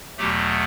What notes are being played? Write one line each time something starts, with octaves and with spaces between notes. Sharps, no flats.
E2 B2 F#3 A3 G4